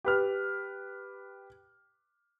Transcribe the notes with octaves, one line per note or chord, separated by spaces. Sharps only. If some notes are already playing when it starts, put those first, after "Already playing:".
G4 B4 F6